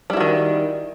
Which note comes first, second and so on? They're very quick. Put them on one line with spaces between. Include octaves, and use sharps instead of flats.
G3 E4 F#4 D#3